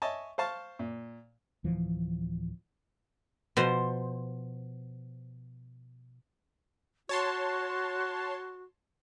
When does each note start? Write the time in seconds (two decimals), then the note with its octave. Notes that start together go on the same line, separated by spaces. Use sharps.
0.02 C#5 D#5 E5 G#5 A5 C#6
0.38 C5 F5 A5 C#6
0.79 A#2
1.64 D1 E3 F3
3.57 B2 F3 C5
7.09 F#4 C#5 A5 C6